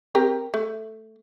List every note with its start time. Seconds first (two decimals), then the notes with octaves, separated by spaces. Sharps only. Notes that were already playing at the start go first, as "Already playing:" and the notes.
0.15 C4 G4 A#4
0.54 A3